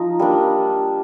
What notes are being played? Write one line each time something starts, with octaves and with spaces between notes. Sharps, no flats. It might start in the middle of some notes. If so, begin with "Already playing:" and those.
Already playing: F3 D#4
G3 A#3 D4